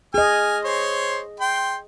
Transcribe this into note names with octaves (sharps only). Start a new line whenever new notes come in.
G#4 D#5 G#5 F6
C5 C#5 C6
G5 C6